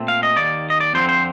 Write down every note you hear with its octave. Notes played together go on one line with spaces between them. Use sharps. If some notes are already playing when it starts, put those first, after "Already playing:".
Already playing: A#2 A3 C4
F5
D#5
D#2 D#3 A#3 D5
D#5
D5
F2 D3 F3 C4 C5
C5